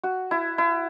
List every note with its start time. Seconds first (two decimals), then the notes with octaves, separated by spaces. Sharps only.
0.04 F#4
0.31 E4
0.58 E4